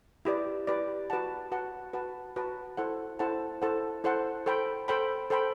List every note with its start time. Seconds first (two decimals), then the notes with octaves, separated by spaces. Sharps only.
0.25 E4 G4 B4 D5
0.67 E4 G4 B4 D5
1.10 F#4 B4 F#5 A5
1.52 F#4 B4 F#5 A5
1.93 F#4 B4 F#5 A5
2.36 F#4 B4 F#5 A5
2.77 E4 A4 C5 F#5 A5
3.19 E4 A4 C5 F#5 A5
3.62 E4 A4 C5 F#5 A5
4.04 E4 A4 C5 F#5 A5
4.46 A4 C5 G5 B5
4.88 A4 C5 G5 B5
5.30 A4 C5 G5 B5